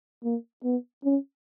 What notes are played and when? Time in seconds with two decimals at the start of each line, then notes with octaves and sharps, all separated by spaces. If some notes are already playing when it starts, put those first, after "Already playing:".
0.24 A#3
0.64 B3
1.05 C#4